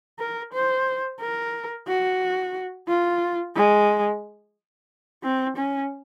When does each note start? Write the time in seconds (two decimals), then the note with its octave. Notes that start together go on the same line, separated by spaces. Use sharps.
0.19 A#4
0.53 C5
1.20 A#4
1.88 F#4
2.88 F4
3.56 G#3
5.23 C4
5.57 C#4